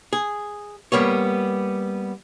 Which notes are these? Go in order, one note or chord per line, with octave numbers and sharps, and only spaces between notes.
G#4
G3 A#3 B3 C#5